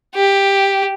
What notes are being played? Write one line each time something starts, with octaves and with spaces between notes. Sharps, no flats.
G4